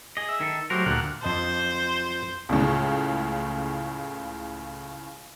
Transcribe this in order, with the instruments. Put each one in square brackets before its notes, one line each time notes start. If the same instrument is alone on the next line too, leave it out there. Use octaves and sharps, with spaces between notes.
[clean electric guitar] G#4 D#5
[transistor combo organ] E5
[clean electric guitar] D#3 A4
[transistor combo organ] F#3 C5 [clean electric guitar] A3 G4 A#4
[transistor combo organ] D2 A#2 F#5
[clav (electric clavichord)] F2 D#5 A5 [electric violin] C5
[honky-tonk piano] C#2 A2 C#3